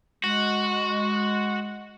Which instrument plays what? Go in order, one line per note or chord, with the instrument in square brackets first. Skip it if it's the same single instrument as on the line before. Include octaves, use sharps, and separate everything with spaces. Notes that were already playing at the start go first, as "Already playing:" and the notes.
[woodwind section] G#3 [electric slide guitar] F#4